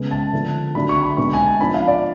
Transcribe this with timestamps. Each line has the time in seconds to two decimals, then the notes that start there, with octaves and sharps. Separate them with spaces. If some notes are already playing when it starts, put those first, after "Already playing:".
Already playing: C#3 G#3 B3
0.11 A5
0.33 D3 F3 B3 D4
0.75 D3 F#3 A3 D4 B5
0.89 C#6
1.03 B5
1.17 B2 G#3 B3 D4 C#6
1.33 G#5
1.46 A5
1.60 F3 B3 D4 B5
1.74 F5
1.88 D5